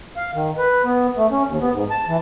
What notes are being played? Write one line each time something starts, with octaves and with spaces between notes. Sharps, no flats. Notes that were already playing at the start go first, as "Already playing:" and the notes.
F5
D#3
B4
B3
A3
C#4
D#2
B3
G#2
A5
E3